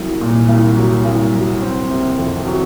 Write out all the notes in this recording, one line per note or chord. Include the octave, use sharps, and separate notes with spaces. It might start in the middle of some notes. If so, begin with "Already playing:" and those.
Already playing: C2 F#3
A#2
C2
F#3
C2
F#3
C4
C3
F2
F#3